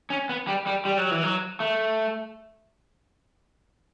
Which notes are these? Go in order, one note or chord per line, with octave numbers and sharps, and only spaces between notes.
C#4
B3
G3
G3
G3
F#3
E3
F#3
A3